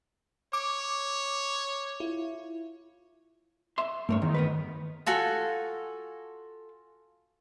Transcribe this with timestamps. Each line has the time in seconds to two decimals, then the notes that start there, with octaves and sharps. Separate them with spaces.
0.53 C#5 D6
2.00 E4 F4
3.78 E5 C6
4.09 G2 A3 A#4 C#5
4.22 E2 D#3
4.34 B3 A#4 B4
5.06 F4 F#4 A4 G#5